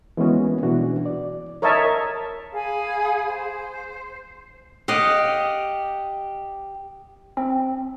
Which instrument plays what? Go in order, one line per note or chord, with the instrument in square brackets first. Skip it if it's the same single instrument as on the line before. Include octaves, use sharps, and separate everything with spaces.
[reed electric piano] E3 G#3 A#3 B3 C#4 F#4
B2 E3 D4 F#4
D5
[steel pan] A#4 C#5 D#5 E5 A5
[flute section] G#4 F5 G#5 B5
C5
[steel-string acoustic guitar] G4 [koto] D#5 F5 F#5
[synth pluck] C4